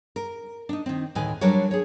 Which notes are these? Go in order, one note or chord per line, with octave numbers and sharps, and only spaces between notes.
A#4
D4 D#4
D#3 C4
D2 A2 D#3 B4 G#5
F#3 G3 D4 A#4 B4 C#5
G#4 C#5